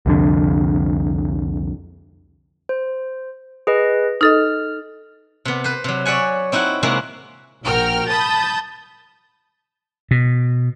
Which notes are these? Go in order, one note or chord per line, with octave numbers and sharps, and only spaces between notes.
C2 F2 D3
C5
G#4 B4 D#5
D#4 A4 D#5 F6
C3 B3
B4 C5
C3 F#3
C#5 D5 E5 F#5 G#5
C4 D#4 E4 F#4 F#5
C3 G#3 A#3 E4 F#4
A#1 F#4 A#4 G5 F6
A5 B5 D#6 G6 A6
B2